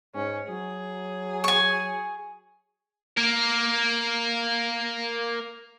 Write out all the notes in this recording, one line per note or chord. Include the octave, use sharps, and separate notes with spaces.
G#2 C#4
F#3 G#4
G#5 C#6
A#3 A#4